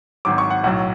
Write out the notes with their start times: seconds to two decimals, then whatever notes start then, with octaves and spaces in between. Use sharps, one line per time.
0.25 G#1 G#2 F#3 D6
0.38 C#6
0.50 F#5
0.64 B1 A2 F#3 F#5